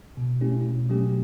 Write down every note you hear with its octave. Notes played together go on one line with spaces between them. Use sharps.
B2
A3 C#4 E4 G4
B2
F#3 A3 C#4 G4